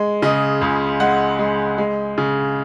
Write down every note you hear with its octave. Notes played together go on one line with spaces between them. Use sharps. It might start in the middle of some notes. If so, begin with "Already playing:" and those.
Already playing: G#3
C#3 D#5
C#2
G#3 F#5
G#3
G#3
C#3